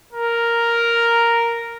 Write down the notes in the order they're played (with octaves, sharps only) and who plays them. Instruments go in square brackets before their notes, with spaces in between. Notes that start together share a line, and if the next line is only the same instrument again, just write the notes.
[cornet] A#4